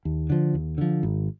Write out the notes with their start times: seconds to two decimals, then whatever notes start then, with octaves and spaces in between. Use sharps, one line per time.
0.05 D#2
0.30 D3 F3
0.54 D#2
0.78 D3 F3
1.03 G#1